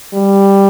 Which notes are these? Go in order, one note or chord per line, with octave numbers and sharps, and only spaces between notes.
G3